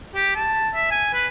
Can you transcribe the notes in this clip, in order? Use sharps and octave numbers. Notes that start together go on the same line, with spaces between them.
G4
A5
E5
G#5
B4